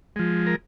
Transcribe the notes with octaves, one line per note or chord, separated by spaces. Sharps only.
F3 G#3
A#4